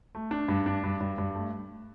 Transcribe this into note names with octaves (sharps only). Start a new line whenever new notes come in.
A3
D4
G2
D4
G2
G2
G2
A3